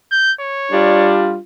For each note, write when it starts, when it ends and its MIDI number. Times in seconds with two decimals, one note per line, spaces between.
0.12 0.32 91
0.41 1.12 73
0.72 1.37 55
0.72 1.37 62
0.72 1.37 65